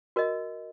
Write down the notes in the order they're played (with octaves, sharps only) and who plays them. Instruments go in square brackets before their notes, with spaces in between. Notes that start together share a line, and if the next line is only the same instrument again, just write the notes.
[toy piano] F#4 A#4 D#5